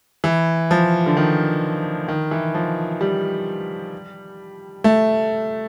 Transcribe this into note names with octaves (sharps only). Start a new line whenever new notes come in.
E3
F3
D3
D#3
D#3
E3
F3
G3
A3